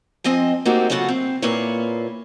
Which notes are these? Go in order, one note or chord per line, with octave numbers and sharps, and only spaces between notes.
F3 C4 D#5 G#5
A3 A#3 C4 D#4 F#4 G4
C#3 F#3 F4 F#4 A4
C4
A#2 A#3 E4 F4 B4 C#5